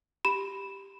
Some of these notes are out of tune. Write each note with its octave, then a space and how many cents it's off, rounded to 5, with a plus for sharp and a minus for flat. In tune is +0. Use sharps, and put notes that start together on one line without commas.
G4 +0 B5 +0